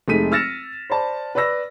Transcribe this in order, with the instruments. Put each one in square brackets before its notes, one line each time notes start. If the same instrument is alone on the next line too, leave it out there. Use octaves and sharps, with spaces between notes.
[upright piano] F1 G#3 A3 D#4 B6 D#7
E6 F6 A6 A#6 C#7 E7
C5 D5 A5 B5
B4 D5 B5 E6 A#6